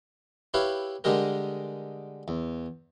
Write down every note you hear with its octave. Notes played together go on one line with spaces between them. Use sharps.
E4 G4 B4 C#5 F5
D3 G3 G#3 G4 A#4
E2